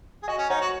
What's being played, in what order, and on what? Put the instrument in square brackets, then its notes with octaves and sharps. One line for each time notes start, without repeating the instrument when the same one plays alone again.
[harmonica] G#4
[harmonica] F#4 [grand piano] D#5 G#5
[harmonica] C#4
[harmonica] D#4 [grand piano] C#5 F#5
[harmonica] F#4